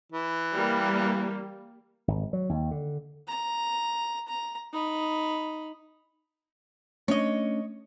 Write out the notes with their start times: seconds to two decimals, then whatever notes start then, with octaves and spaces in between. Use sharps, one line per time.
0.12 E3
0.53 G3 A#3
2.08 G#1
2.33 F#3
2.49 D#2
2.71 D3
3.28 A#5
4.28 A#5
4.73 D#4 B5
7.08 A3 C#4 D4 C#5 D#5